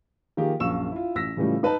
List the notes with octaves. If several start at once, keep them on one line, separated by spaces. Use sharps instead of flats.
D#3 F3 A#3 F4 G4 G#4
A#1 F#2 F5 C#6 E6 E7
E4 F4
A1 E6 A#6 B6
A2 C#3 E3 F3 G3 A3
D#4 B4 A5 B5